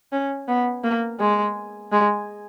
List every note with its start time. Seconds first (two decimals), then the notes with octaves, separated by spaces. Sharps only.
0.12 C#4
0.48 B3
0.84 A#3
1.20 G#3
1.92 G#3